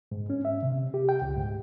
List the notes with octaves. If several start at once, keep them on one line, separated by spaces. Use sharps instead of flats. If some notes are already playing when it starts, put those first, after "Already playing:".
G#2
C#4
E5
C3
G4
G5
C#2
G#2